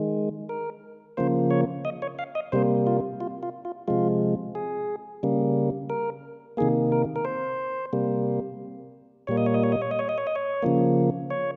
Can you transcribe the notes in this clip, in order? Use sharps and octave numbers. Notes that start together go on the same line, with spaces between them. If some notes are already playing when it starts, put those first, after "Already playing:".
Already playing: D#3 G#3
A#4
C#3 F3 A#3 C5
C#5
D#5
C#5
F5
D#5
C3 G3 A#3 C5
F4
F4
F4
F4
C3 F3 G#3 F4
G#4
C#3 G3 A#3
A#4
C3 D#3 A#3 G#4
A#4
A#4
C5
C3 G3 A#3
A#2 G3 A#3 C#5
D#5
C#5
D#5
C#5
D#5
C#5
D#5
C#5
D#5
C#5
D#5
C#5
C#3 F3 A#3
C#5